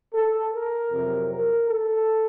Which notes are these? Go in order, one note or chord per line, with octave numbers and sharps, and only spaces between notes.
A4
A#4
F2 C3 F#3
A#4
A4